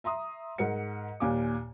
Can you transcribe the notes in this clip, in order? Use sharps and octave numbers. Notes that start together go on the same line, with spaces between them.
E5 A#5 C6 D#6
G#2 A#4 F#5 C#7
D#2 A#2 F5 G#5 D6